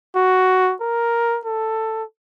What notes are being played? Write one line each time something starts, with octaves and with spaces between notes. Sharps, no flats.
F#4
A#4
A4